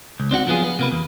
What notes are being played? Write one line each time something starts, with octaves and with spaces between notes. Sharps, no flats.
C#2
C4 D4 F#4 F#5
F3 F#3 B3 F4 G#4
B3
C3 A#3 B4
E2